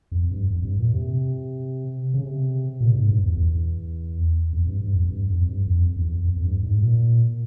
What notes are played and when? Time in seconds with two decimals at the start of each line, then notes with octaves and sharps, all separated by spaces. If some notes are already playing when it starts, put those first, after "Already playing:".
0.12 F2
0.31 G2
0.50 F2
0.65 G2
0.79 A#2
0.94 C3
2.14 C#3
2.23 C3
2.80 A#2
2.94 G#2
3.09 G2
3.24 E2
3.37 E2
4.53 F2
4.67 G2
4.81 G2
4.96 F2
5.10 G2
5.30 F2
5.49 G2
5.67 F2
5.96 E2
6.25 F2
6.38 F2
6.44 G2
6.63 G#2
6.82 A#2